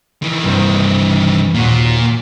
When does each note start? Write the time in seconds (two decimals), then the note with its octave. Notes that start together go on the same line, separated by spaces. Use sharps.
0.22 D#3 E3
0.44 C2 G2 C5
1.54 D#2 A#2 F#4